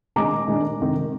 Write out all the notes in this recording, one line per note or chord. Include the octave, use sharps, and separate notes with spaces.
D#3 G#3 D4 A#5 D6
D#3 G#3 D4
C3 D#3 G#3